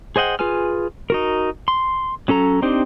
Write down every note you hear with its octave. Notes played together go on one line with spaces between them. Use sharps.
G#4 C5 D#5 F#5 G5
F4 G#4 B4 G#5 F6
D#4 F#4 A#4
C6
F#3 C#4 A4 A#5
C4 D4 D#4 G4 C5